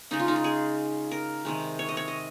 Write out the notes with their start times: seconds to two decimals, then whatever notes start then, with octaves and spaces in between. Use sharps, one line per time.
0.11 C#3 G#3 D#4
0.20 F4
0.28 D#4
0.36 F4
0.44 G#4
1.11 A#4
1.45 C3 D#3 G#3
1.79 C#5
1.89 D#5
1.97 C#5
2.08 D#5